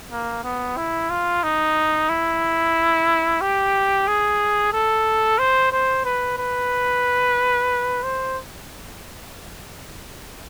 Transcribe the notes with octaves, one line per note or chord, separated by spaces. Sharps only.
A#3
B3
E4
F4
D#4
E4
G4
G#4
A4
C5
C5
B4
B4
C5